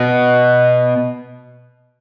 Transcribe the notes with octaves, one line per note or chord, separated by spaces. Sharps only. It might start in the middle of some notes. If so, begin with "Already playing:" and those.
Already playing: B2